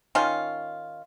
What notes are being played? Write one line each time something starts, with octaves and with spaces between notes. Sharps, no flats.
D#3 C#4 F4